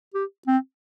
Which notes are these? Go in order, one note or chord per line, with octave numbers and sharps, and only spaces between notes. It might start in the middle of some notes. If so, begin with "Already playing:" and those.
G4
C4